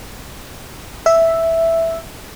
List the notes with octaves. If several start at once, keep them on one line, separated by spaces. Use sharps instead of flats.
E5